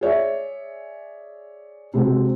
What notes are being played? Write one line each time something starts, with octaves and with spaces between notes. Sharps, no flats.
G#4 C#5 D5 E5
C3 G#3 C4 F#4